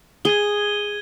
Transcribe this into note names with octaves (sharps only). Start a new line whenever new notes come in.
G#4 G#6 D#7 G7